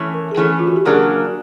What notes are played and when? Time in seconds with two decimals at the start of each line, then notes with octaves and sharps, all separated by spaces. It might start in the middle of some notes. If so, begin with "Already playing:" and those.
Already playing: E3 A3 C#4
0.14 A#4
0.31 G#4
0.37 E3 A3 C#4 A4
0.59 F4
0.67 F#4
0.76 G4
0.85 C#3 F#3 A#3 D4 G#4